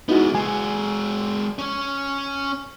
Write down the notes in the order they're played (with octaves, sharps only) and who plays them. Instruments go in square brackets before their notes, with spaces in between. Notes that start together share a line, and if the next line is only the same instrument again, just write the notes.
[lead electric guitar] G#3 B3 [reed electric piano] D#4 E4 F#4
[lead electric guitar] G#3 F#4 [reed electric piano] G#5
[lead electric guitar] C#4 C#5